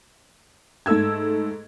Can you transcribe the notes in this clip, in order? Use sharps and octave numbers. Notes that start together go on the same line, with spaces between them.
G#2 A3 A4 E6 G#6